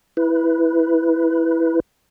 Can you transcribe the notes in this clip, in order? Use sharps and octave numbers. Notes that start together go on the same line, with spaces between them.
E4 B4